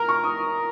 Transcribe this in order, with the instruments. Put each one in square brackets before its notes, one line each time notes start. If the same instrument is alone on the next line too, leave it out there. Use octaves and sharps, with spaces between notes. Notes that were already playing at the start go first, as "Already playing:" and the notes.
Already playing: [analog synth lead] A#4 [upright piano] A#5
[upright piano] C#6
D#6